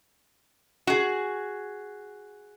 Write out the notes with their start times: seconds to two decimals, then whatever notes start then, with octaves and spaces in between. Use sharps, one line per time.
0.87 F#4 G#4